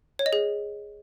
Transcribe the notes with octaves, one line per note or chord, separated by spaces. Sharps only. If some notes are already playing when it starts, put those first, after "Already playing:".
C#5
D#5
G#4